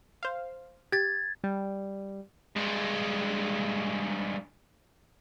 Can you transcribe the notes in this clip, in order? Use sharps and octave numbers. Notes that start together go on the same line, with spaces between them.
C5 F5
G4 G#6 A6
G3
G2 G#3